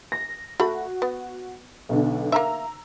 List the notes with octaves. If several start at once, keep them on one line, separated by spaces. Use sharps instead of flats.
A#6
A3 F#4 B5
B3
B1 B2 D3
A#3 E5 A#5 E6